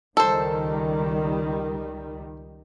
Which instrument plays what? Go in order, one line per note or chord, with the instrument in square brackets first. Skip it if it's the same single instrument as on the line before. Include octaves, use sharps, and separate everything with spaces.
[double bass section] C#2 D#3 G3 [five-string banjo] A4 C5